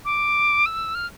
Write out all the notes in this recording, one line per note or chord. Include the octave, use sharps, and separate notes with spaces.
D6
E6
F6